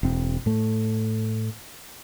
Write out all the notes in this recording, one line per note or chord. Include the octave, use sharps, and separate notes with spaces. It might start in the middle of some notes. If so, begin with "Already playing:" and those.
E1 C4
A2 A3